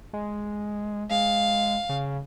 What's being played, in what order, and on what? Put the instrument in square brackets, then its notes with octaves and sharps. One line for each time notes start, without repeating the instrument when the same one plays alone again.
[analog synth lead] G#3
[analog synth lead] G#3 [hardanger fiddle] F5
[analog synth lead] C#3